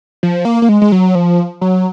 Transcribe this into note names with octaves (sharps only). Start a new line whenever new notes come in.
F3
A#3
A#3
G#3
G#3
F#3
F3
F#3